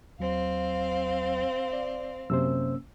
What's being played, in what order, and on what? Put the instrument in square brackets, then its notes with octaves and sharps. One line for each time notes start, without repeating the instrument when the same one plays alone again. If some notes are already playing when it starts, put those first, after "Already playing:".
[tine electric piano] D#2 F#3 [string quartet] C4 F5
[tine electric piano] D5
[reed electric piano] F#2 C3 C5 [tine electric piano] A#3 C#4 E6